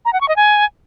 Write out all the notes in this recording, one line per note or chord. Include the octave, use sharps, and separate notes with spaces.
A#5
F#5
C#6
D#5
G#5